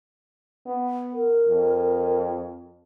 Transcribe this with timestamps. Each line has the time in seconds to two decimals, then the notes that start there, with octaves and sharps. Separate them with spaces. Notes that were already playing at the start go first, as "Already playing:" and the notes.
0.66 B3
1.13 A#4
1.48 F2